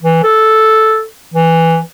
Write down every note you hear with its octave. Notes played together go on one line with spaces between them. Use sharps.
E3
A4
E3